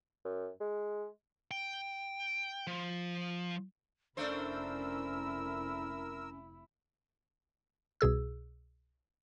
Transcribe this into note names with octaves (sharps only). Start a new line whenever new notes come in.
F#2
G#3
G5
F3
F1 A3 C#4 D4 E4 A#4 C5 E6
C2 B2 G#4 E6